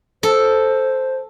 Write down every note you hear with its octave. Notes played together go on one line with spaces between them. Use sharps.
A4 C5